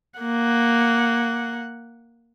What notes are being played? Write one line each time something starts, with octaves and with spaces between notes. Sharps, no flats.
A#3 F#5